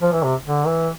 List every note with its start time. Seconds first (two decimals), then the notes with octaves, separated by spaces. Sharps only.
0.02 F3
0.12 E3
0.23 C3
0.45 D3
0.66 E3